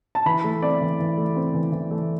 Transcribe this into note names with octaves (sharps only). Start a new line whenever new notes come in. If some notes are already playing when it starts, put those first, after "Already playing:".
A5
E3 B5
A3
C4 D5
E3
E3
A3
C4
E3
E3
A3